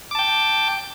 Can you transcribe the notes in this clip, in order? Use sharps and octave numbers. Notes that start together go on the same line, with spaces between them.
G5 A5 D6